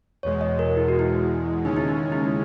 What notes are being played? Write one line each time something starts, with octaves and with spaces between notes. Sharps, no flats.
E2 B2 G#3 C#5
D#5
A#4
E4
F#4
E4
D#2 C#3 G#3 C#4 D#4
E4
D#4
E4